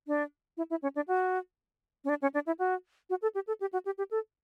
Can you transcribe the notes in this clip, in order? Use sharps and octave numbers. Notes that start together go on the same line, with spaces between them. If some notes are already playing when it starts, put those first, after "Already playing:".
D4
E4
E4
C#4
D4
F#4
C#4
D4
C#4
D4
E4
F#4
F#4
A4
G4
A4
G4
F#4
G4
G4
A4